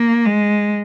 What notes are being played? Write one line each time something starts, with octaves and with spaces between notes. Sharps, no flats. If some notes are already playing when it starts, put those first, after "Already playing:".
Already playing: A#3
G#3